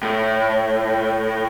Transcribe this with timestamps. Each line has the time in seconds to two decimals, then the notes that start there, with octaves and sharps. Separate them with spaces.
0.03 A2